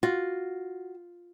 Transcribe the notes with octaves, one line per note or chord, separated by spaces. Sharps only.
F4 F#4